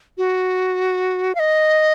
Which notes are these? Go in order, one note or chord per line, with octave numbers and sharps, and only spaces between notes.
F#4
F5
D#5